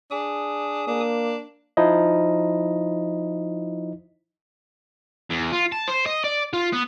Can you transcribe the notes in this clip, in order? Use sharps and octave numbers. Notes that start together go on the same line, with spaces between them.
D4 G#4 G#5 D#6
A#3 D4
F3 D#4 E4 D#5
E2
F4
A5
C5
D#5
D5
F4
B3